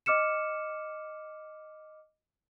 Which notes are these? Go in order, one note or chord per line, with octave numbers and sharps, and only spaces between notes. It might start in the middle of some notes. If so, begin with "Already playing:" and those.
D#5 D6 F6 C#7 E7